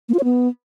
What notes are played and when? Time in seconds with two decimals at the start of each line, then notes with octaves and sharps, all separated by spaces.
0.09 A#3
0.14 F4
0.19 C#5
0.24 B3